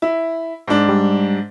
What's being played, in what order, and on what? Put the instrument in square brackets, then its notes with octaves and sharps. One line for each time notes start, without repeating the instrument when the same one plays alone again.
[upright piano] E4
G#2 D4
[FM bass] G3